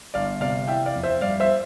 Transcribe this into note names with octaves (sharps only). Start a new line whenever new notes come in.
G1 D5 F5
C3 D5 F5
E3 E5 G5
D5 F5
F2
C5 E5
G2 D5 F5
C5 E5